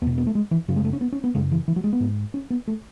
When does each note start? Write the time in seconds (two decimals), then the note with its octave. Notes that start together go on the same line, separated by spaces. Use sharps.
0.02 E2 B3
0.07 B2
0.18 B3
0.27 A3
0.35 G#3
0.51 E3
0.68 F#2 C#3 F#3
0.76 G#3
0.84 A3
0.93 C#4
1.01 B3
1.12 C#4
1.24 B3
1.34 F#2 C#3 G#3
1.51 E3
1.68 E3
1.76 F#3
1.84 G#3
1.93 B3
2.00 G#2
2.34 C#4
2.50 B3
2.68 A3